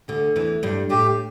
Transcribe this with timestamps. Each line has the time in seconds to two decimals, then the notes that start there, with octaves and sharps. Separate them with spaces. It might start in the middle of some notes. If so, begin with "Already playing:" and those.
0.08 D2 D3
0.36 E2 E3
0.63 G2 G3
0.90 A2 A3 G4